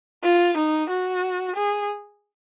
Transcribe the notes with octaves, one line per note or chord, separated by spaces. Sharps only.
F4
D#4
F#4
G#4